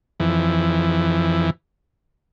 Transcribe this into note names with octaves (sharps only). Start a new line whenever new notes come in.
F2 E3